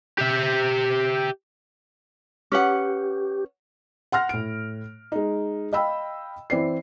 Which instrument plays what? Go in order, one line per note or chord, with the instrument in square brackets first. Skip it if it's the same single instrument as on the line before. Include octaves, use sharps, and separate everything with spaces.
[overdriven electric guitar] G4 E5
[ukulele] C#4 B4 F#5 [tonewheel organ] G4
[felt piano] F#5 C6 F6 A#6
A2 D7
G#3 D#4
D#5 F5 G5 B5 E6
E3 C4 D5 C7